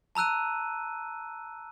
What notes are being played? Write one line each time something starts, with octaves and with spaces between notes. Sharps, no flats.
A5 A#5 E6 F#6 D#7